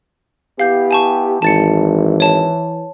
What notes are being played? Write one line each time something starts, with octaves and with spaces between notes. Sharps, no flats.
B3 E4 G4 F5 G6
G#5 A5 C#6
G#1 E3 A5 A6 C#7
C#5 A5